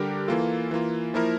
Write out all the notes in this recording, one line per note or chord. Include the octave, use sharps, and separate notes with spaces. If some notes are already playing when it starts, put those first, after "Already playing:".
Already playing: D3 G3 D4 G4 A#4
E3 A#3 F4 A4
E3 A#3 F4
F3 A#3 E4 A#4